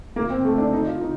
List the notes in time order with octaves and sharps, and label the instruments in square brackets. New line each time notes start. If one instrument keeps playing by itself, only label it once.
[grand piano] A#3
C4
A3
D4
D#4
F4
D#4